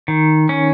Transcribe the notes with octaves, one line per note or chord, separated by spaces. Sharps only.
D#3
C#4